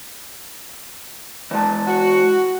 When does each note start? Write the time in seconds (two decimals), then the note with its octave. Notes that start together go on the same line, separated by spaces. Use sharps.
1.51 E3 G#3 A5
1.87 F#4